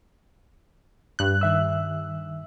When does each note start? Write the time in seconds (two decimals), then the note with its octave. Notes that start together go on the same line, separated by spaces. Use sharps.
1.19 G2 F#6
1.41 D#3 E5 E6